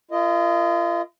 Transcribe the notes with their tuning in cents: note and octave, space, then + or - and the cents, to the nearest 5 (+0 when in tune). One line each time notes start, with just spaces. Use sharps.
F4 -40 A#4 -25 D#5 +0